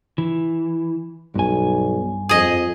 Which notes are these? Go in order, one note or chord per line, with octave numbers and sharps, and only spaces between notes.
E3
B1 G2 G#5
F2 G#4 D#5